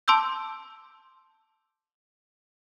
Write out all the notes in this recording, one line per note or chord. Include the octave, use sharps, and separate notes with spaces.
A5 C6 D6 E6 G6